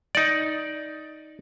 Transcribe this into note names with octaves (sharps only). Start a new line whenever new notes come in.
D#4 D5